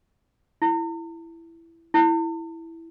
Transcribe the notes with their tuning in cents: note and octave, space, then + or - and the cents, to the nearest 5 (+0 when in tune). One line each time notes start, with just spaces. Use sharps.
E4 +10
E4 +0